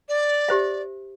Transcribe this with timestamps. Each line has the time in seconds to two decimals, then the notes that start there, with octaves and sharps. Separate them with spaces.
0.08 D5
0.49 G4 C5 E5